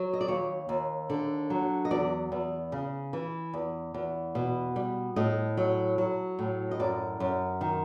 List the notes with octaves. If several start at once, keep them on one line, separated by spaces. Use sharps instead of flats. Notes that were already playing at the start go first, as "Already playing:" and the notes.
Already playing: F#3
D#5
D5
D#2 C#5
D#2
D3
F#3
D#5
E2 D5
E2
C#3
E3
E2
E2
B2
G3
A2 D#5
F#3
F#3
A2
D#5
F#2 D5
F#2
D#3